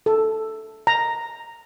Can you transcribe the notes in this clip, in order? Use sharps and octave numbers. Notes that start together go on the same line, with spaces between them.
A4
A#5